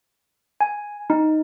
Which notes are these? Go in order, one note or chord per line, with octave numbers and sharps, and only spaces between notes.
G#5
D#4